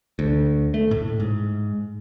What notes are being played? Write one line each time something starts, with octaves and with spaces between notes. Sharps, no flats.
D2
A3
A2
G#2